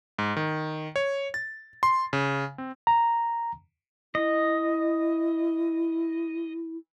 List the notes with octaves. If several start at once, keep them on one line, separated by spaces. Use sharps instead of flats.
G#2
D#3
C#5
A6
C6
C#3
C4
A#5
E4 D#5